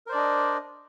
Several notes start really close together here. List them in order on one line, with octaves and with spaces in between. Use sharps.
A#4 C5 D5 D4 D#5